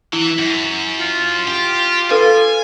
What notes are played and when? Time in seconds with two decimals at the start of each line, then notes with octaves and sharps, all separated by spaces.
0.13 E3 E4
0.38 F#2
1.00 F4
1.48 G4
2.11 A4 B4 F5 G#5